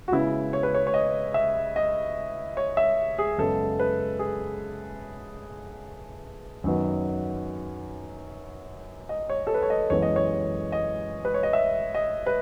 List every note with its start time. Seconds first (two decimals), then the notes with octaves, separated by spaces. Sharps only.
0.08 F#4
0.12 C#3 G#3 B3 E4
0.53 C#5
0.63 B4
0.75 C#5
0.87 C#5
0.94 D#5
1.34 E5
1.76 D#5
2.57 C#5
2.77 E5
3.18 G#4
3.38 F#2 C#3 G#3 B3 A4
3.80 B4
4.19 G#4
6.64 F#2 D#3 F#3 B3
9.09 D#5
9.30 C#5
9.47 A4
9.54 B4
9.63 C#5
9.70 D#5
9.90 F#2 E3 G#3 B3 C#5
10.02 D#5
10.16 C#5
10.72 D#5
11.25 B4
11.34 C#5
11.43 D#5
11.53 E5
11.94 D#5
12.26 B4